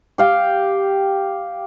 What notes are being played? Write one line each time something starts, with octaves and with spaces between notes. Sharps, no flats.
G4 F5 G5